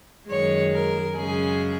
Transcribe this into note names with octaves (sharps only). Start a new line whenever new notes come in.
F#2 D#3 G#3 C#5
A#4
F#2 C#3 G#3 G#4